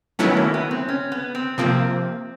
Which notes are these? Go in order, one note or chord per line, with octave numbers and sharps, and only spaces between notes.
D#3 F#3 A3 B3 C#4 E4
A#3
B3
C4
C#4
B3
C4
C3 F3 A#3 C4